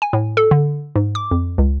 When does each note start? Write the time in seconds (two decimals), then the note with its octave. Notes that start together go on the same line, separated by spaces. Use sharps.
0.02 G#5
0.13 A2
0.37 A4
0.51 D3
0.96 G#2
1.15 D6
1.31 F2
1.58 C#2